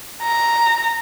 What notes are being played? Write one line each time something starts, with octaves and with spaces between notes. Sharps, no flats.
A#5